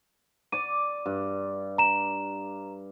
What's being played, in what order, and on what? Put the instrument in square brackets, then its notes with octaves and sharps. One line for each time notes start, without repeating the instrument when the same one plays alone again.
[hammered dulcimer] D5 D6 [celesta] D#7
[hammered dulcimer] G2
[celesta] A#5 E7